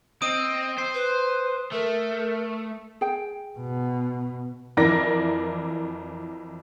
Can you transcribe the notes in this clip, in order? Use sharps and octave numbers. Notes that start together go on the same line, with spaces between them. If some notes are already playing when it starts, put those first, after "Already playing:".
C4 D#5 D#6 D7 D#7
C5 C7
B4
A3 A#4
G#4 G5
B2
F2 E3 A#4 D5 A#6